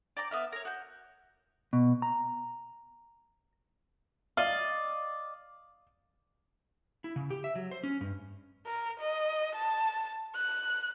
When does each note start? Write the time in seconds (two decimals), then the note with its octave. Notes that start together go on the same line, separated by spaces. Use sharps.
0.17 D5 G5 A#5 D6
0.31 B3 E5 F5
0.52 A#4 C#5
0.65 F#4 G6
1.73 B2
2.02 A#5
4.37 D5 D#5 F5
7.04 E4
7.16 C#3
7.30 G4
7.44 E5
7.55 F#3
7.71 C5
7.83 C#4
8.01 G2
8.67 A#4
9.00 D#5
9.56 A5
10.35 F#6